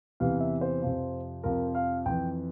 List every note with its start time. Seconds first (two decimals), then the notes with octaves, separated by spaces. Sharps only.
0.20 E2 C3 E3 F5
0.41 E5
0.61 C5
0.82 F2 C3 F3
1.44 F2 C3 F3 A#4
1.75 F5
2.06 F2 E3 G5